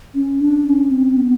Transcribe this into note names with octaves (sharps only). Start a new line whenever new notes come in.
C#4
D4
D4
C#4
C4
B3